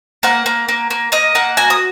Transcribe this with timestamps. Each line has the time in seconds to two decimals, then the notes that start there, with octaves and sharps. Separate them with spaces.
0.23 A#3 F#5
0.46 A#3
0.69 A#3
0.90 A#3
1.12 A#3 D#5
1.35 A#3 F#5
1.57 F#4 G#5
1.70 D#6